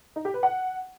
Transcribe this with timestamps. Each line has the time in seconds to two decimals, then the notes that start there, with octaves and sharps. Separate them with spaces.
0.16 D#4
0.25 G4
0.34 B4
0.43 F#5